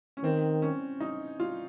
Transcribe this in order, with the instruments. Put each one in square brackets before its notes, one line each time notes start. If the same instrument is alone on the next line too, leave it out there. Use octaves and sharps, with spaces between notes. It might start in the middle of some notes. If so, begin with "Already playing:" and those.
[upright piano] C#4
[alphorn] D#3 [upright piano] C4
[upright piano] C#4
D#4
F4